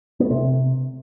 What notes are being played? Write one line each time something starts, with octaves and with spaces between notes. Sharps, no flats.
B3
A3
C3